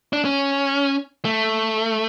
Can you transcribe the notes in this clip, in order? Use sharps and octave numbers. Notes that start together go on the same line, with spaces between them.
D4
C#4
A3